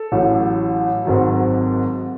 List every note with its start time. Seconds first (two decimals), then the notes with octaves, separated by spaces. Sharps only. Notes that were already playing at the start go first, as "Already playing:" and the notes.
Already playing: A4
0.12 A1 A2 F#3
1.05 G#1 G#2 D#3 F#3